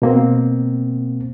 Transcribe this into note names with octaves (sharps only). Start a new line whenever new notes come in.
B2 A#3 C4